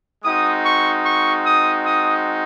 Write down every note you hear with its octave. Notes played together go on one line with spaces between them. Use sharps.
G#3 C4 D#4 F#4 D#6
C#6
C#6
D#6
D#6